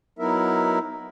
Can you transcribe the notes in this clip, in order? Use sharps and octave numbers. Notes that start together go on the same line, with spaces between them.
F#3 B3 D#4 E4 A#4 E5